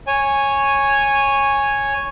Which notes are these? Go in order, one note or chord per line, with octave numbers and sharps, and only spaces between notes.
C#5 G#5